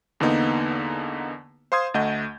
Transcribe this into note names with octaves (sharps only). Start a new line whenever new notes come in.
E2 D3 A#3 B3 D#4
C5 F5 C6 D#6 G#6
D2 A3 D#5 F#5 G6